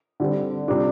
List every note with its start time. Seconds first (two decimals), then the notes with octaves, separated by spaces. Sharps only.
0.20 D3 G3 C4
0.68 C3 G3 D4 F4